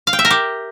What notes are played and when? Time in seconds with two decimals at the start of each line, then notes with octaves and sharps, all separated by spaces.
0.07 F5
0.13 G5
0.19 E5
0.25 A#4
0.30 G4